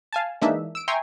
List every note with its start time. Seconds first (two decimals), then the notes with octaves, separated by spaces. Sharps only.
0.13 F5 G#5 A5
0.42 E3 G#3 A#3 D4 D#4 E5
0.75 E6 D7
0.88 E5 G5 G#5 A#5 C6 C#6